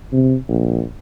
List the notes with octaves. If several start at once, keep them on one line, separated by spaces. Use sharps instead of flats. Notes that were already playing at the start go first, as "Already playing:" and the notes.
C3
A#1